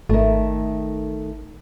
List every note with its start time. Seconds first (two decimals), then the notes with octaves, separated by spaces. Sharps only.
0.09 G#1 D#3 A3